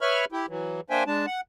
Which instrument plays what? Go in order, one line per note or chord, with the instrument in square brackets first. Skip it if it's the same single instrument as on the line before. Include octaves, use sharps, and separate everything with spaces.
[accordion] B4 C#5 E5 B5 C#6 F6
E4 G4
E3 F#3
A#3 D4 C5 E5 G5 G#5
G#3 D4 A5
F#5